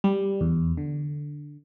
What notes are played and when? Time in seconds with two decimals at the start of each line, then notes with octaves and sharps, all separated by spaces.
0.04 G3
0.41 E2
0.77 D3